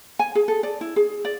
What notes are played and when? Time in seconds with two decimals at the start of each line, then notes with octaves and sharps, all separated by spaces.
0.19 G#5
0.35 G#4
0.48 A4
0.63 D5
0.81 E4
0.96 G#4
1.25 D5